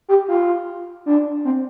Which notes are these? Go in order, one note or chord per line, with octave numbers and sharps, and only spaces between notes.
G4
F4
D4
C4